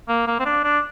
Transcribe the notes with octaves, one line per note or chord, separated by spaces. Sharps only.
A#3
A#3
C4
D4
D4